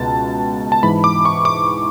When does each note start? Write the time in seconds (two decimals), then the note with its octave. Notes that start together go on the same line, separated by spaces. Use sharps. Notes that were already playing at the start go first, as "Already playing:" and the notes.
Already playing: C#2 B2 A5
0.72 A5
0.83 G#2 E3 B5
1.04 D6
1.25 C#6
1.45 D6